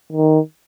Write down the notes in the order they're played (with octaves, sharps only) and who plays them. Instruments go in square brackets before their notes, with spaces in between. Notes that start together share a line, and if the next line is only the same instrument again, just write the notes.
[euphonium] D#3